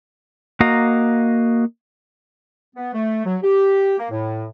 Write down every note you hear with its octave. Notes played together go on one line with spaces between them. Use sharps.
A#3 F#4 D#5 F5 A#5
B3
A3
F#3
G4
A#3
A2